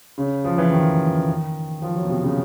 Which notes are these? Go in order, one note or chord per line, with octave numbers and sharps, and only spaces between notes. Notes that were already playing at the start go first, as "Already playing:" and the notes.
C#3
F3
E3
D#3
F3
F#3
B2
C3
C#3